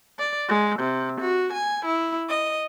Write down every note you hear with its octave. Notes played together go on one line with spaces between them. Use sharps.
D5
G#3
C3
F#4
G#5
E4
D#5